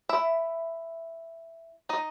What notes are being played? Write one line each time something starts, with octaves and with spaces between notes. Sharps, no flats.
E4 E5
D#4 D#5